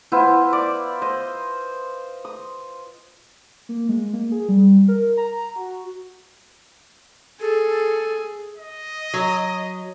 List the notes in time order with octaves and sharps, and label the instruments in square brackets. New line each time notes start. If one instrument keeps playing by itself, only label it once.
[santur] B3 E4 F4 C5
D5 D6
C5 D#5
D#6
[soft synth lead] A#3
G#3
A#3
G#4
G3
A#4
A#5
F#4
[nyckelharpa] G#4 [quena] A4
[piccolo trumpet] D#5
[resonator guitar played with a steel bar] F#3